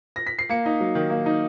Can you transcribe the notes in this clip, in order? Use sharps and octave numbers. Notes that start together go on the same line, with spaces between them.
A#6
B6
C7
A#3 C#7
D#4
F#3
D#3
A#3
D#4